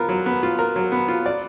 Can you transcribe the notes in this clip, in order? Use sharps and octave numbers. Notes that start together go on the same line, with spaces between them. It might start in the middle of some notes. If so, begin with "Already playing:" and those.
Already playing: B3 F4 A#4
F#3
B3
F4
A#4
F#3
B3
F4
D5